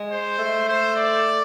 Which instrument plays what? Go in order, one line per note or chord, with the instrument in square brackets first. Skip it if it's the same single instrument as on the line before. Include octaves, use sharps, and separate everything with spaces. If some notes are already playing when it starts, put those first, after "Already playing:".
Already playing: [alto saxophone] G#3
[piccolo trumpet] C5
[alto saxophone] A3
[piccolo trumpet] C5
D5